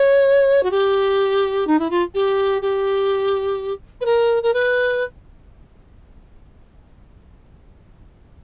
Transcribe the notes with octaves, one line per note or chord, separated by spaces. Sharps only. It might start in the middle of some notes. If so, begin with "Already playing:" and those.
Already playing: C#5
F#4
G4
D#4
E4
F4
G4
G4
B4
A#4
A#4
B4